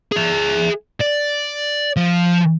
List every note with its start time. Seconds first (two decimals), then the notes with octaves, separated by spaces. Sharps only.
0.12 G#4 E5
1.01 D5
1.96 F3